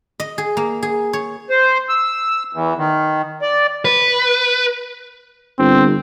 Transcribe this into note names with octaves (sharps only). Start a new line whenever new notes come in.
D#5
G#4
A#3
G#4
C#5
C5
E6
E2
D#3
D5
B4
G1 C4